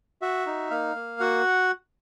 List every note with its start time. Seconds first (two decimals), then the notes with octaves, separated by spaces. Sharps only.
0.22 F#4 E5
0.47 D#4
0.70 A#3 F5
0.96 A#3
1.20 F#4 F#5